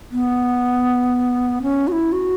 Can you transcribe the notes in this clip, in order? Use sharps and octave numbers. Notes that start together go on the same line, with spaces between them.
B3
C#4
F#4
E4
F#4